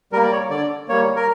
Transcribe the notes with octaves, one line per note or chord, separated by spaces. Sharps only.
G3 A#3 A#4
D5
C#5
D3 D5
G3 A#3 C#5
A#4